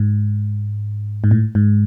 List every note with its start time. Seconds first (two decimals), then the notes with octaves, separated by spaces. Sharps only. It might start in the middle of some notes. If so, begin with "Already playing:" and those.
Already playing: G#2
1.24 G#2
1.31 A2
1.55 G#2